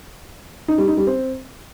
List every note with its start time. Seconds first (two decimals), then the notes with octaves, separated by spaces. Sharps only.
0.68 D#4
0.78 G3
0.88 D#4
0.97 G3
1.07 C4